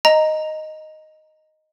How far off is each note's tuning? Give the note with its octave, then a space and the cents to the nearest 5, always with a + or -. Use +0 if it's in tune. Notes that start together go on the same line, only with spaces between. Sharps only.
D#5 +0 A#5 +0